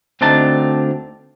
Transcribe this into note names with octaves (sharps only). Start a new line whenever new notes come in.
D2 C4 D4 D#4 A5